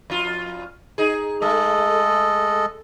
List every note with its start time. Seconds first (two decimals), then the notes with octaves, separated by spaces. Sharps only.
0.10 F2 F4
0.98 D#4 G#4
1.42 G#3 A3 A4 D#5